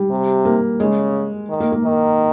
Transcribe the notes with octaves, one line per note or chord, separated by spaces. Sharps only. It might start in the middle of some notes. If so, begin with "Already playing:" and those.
Already playing: G3
C3
A#3
C#3 G#3
D#3
A#3
A#3
D#3